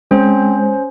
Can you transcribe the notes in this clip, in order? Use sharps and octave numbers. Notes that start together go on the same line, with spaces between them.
G#3 C4 C#4 C5